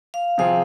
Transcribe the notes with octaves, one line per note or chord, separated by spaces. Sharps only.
F5
C3 F3 C4 G#4 F5